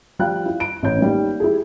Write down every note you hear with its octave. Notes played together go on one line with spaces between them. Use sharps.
F3 G3 F5 G5 F#6
E4
D7
A1 C#5 G6
G3 A#3 D#4
E4 G4 G#4